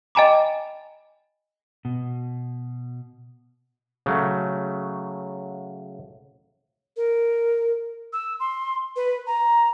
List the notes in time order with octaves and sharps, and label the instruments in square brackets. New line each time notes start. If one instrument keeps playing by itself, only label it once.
[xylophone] D#5 G5 G#5 A#5 B5 D6
[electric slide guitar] B2
[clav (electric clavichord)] C#3 F#3 A3
[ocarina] A#4
E6
C6
B4
A#5